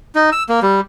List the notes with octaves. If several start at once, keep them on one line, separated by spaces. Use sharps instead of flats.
D#4
E6
A#3
G3